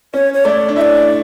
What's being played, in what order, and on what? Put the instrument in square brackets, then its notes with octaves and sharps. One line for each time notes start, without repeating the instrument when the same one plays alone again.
[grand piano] C#4 [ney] C#5
[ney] C#5
[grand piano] A3 [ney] D5
[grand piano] D4
[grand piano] E4 [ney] E5
[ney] D5